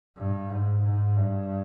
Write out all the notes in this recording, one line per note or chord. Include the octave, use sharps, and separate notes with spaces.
G2
G#2
G#2
G2